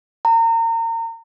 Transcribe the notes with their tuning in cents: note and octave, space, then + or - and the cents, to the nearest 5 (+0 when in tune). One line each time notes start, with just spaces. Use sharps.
A#5 -30